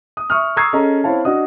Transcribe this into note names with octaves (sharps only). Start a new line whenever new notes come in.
D#6
E5 C#6 D#6 F6
A#5 C#6 D#6 E6 G#6 C7
C#4 G#4 A4 D#5 A#5
C4 E4 C#5 F5 A5
D4 F#4 D#5 D#6